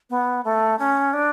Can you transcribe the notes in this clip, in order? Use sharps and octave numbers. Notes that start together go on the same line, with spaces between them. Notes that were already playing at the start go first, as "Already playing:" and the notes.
B3
A3
C#4
D4